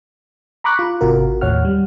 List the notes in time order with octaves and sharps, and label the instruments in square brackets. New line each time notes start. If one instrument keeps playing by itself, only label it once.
[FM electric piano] A#5 B5 C#6 D6 F#6
F4
G#1 C3 F4 F#4 A#4
D#2 A2 C#5 F#5 F6
G3